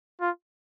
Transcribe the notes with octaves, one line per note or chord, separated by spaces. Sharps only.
F4